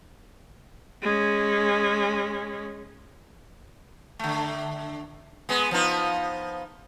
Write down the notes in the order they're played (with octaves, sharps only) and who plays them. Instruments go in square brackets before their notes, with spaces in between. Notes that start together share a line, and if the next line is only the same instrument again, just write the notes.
[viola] G#3 C#4
[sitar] D3 A3
G#3 B3
F3 B3 D#4